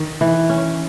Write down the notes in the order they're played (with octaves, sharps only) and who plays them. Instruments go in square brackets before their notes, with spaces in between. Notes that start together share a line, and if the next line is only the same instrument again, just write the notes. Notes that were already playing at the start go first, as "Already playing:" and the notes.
Already playing: [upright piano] D#3
[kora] E3
C#4